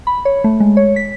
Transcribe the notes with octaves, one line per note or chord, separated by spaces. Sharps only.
B5
C#5
A3
G#3
C#5
B6